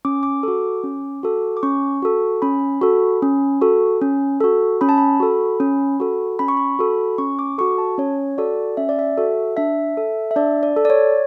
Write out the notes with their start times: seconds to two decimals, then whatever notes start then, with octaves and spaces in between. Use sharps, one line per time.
0.05 C#4 D6
0.23 D6
0.43 F#4 A4
0.83 C#4
1.23 F#4 A4
1.57 D6
1.63 C#4 C#6
2.02 F#4 A4
2.42 C#4 B5
2.82 F#4 A4
3.22 C#4
3.61 F#4 A4
4.02 C#4
4.40 F#4 A4
4.81 C#4 B5
4.89 A5
4.98 B5
5.20 F#4 A4
5.60 C#4
6.00 F#4 A4
6.39 C#4 B5
6.48 C#6
6.57 B5
6.79 F#4 A4
7.18 C#4 C#6
7.39 D6
7.58 F#4 A4 C#6
7.78 A5
7.98 C#4 C#5
8.38 F#4 A4 D5
8.77 C#4 E5
8.89 D5
8.99 E5
9.18 F#4 A4
9.57 D4 E5
9.97 A4
10.31 E5
10.36 D4 D5
10.63 D5
10.77 A4
10.85 D5
10.90 C#5